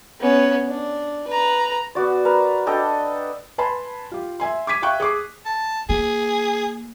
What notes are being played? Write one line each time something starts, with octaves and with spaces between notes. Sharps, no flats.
B3 C#4
D4
B4 A#5
B3 F#4 D5
A#4 B4 A#5
D4 A4 D#5 G5
B4 G#5 A5 B5 C6
F4 G4
E5 G#5 C6
D6 G#6 B6 D#7
E5 F5 G5 C#6 F#6
G#4 C#6 D6 C7
A5
A#3 G#4